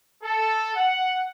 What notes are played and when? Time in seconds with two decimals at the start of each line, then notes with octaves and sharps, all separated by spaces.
0.23 A4
0.76 F#5